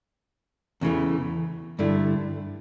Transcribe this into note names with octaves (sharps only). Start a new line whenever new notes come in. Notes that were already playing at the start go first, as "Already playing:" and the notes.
E2 C#3 E3 A3
G2 D3 A3 E4